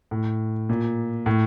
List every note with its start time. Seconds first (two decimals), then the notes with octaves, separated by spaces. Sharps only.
0.11 A2
0.69 A#2
1.26 A2